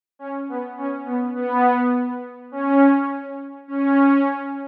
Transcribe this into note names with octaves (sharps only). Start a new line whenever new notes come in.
C#4
B3
C#4
B3
B3
C#4
C#4